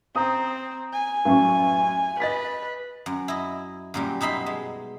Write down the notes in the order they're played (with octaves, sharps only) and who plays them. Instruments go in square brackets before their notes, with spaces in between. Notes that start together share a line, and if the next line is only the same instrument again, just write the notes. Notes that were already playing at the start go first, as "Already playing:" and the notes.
[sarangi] C4 [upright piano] A#5 D#6
[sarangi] G#5
[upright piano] A1 F#2 C#6
[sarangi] B4 [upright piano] D#5 A6 B6
[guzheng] F#2
E4 D#5
F#2 A#2 G3
B2 D#4 E5 B5 C6
G#3